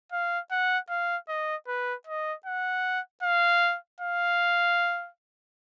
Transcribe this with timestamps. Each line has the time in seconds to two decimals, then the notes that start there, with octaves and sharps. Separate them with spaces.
0.12 F5
0.51 F#5
0.90 F5
1.28 D#5
1.67 B4
2.07 D#5
2.46 F#5
3.22 F5
4.01 F5